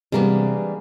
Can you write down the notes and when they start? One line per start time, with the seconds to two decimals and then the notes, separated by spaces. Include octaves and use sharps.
0.12 C3 E3 G3 G#3 A#3 B3 D4